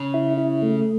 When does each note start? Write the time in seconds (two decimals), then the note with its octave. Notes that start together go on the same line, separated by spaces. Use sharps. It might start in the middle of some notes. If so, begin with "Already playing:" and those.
Already playing: C#3
0.14 E4
0.37 E4
0.62 A3